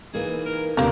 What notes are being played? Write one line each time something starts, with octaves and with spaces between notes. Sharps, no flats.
E3 A#3 D#4 G#4
A#4
D2 C3 A#3 C#4 D4 G4 A#4